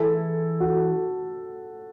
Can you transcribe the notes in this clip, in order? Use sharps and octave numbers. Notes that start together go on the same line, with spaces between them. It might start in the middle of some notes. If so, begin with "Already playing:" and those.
Already playing: E3 A3 E4 G#4 A4
F#4